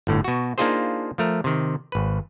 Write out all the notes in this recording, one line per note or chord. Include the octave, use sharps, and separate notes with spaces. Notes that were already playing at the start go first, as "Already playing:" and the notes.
G1 A2 D3
B2 F#4
A#3 D4 D#4 F4 G#4 C5
F3 A3 A#4
C3 D#3
G#1 B4